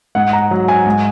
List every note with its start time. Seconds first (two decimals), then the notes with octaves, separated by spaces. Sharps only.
0.15 G#2 F#5
0.33 A#5
0.51 F#3
0.68 G#5
0.86 G#2